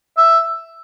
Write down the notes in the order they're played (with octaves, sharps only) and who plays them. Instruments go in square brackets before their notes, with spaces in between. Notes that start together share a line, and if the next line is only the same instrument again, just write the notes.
[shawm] E5